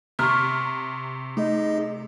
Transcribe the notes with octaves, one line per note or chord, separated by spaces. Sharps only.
C3 A#5 C#6 F6
A3 D#4 G#4 D#5